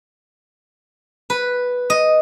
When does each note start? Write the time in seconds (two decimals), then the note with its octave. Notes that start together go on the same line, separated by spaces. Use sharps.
1.30 B4
1.90 D#5